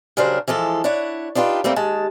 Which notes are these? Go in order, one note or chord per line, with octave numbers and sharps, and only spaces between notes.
C#3 F#3 G3 D4 A#4 C5
E3 F3 G#3 A4
D4 E4 C#5 F#5
D4 D#4 F4 G4 B4
G3 A3 A#3 C4
D#2 G#3 A5